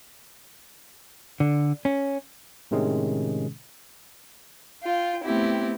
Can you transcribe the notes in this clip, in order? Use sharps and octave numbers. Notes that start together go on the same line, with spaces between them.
D3
C#4
A2 C3 D#3 G#3 C#4 G#4
F4 G5
A3 B3 C4 E4 G4